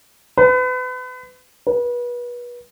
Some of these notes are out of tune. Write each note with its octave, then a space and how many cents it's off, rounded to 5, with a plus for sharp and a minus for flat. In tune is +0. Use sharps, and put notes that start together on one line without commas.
B4 +35
B4 -30